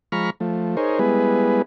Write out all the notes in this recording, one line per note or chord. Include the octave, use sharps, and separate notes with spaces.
F3 G#3 A#5 B5 C#6 F6
F3 A3
D#4 G#4 A#4 C5 C#5
G3 G#3 B3 E4 G#4 B4